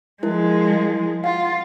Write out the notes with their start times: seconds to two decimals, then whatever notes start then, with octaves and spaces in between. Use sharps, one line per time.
0.23 F3 G#3 E4 A#4
1.24 F4 F5 F#5